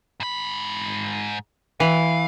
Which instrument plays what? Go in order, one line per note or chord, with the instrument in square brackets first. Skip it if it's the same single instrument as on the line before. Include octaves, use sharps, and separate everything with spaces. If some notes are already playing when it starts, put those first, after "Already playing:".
[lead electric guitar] G#2 B5
[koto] E3 [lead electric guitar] F5